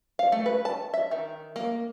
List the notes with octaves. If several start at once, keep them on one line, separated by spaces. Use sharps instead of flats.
F5
A3
B4
A5
E5
D#3
A#3